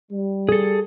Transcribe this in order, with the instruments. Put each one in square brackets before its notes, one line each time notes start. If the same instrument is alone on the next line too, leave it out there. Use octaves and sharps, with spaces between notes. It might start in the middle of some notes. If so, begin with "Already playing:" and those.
[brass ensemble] G3
[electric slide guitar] G#4 A4